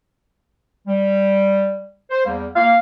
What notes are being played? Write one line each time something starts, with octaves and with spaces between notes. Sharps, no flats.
G3
C5
E2 G3 A#3
A#3 F5